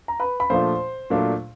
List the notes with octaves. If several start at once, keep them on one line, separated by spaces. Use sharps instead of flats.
A#5
B4 B5
B5
A#2 F3 A3 D4 F4 C5 C6
A#2 F#3 A3 D4 F4